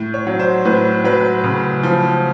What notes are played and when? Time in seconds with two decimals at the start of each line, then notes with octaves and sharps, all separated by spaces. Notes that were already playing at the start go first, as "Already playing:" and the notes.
Already playing: A2
0.14 C#5
0.27 F#3
0.40 C5
0.65 A2 B4
1.04 F#3 B4
1.44 C#3
1.83 F3